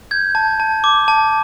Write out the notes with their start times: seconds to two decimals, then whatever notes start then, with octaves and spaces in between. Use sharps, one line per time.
0.11 G6 G#6
0.35 A5
0.60 A5
0.84 D6
1.08 A5